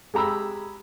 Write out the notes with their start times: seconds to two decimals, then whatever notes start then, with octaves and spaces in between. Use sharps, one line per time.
0.14 G#3 G4 A#5 B5 E6